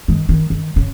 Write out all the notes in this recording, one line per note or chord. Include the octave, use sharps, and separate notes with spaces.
D#3
D#3
D#3
C#3